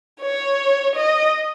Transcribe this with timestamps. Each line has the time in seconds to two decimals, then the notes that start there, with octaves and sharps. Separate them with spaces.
0.21 C#5
0.96 D#5